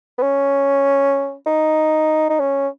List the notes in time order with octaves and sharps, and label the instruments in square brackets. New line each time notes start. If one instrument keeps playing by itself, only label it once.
[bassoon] B3
C#4
D#4
D#4
C#4